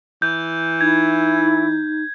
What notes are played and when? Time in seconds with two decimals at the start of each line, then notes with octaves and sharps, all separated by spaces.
0.22 E3 G6
0.81 D#4 E4 G#6